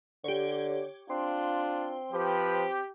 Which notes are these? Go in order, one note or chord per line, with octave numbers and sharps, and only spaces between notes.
D3 G4 C#5
C4 D4 F4 C6
F3 G4 B4